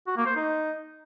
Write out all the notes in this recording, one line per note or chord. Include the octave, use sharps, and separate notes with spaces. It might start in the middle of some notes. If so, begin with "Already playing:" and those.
F#4
A#3
C5
D#4